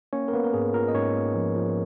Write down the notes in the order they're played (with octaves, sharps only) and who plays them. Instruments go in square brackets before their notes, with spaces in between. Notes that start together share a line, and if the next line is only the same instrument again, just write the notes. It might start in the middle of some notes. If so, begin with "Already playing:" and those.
[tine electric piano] A#3 C#4 C#5
A#4
A#3 B3 B4
A#4
G#2 G#4
F4 A#4
D#5
G#2 C#4 C#5
A#3
F3
F3